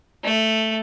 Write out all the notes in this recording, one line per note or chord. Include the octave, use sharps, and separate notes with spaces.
A3